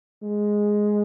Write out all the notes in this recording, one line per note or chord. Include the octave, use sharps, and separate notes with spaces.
G#3